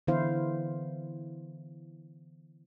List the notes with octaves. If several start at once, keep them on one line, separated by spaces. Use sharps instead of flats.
D3 E3 B3 E4 C5 F5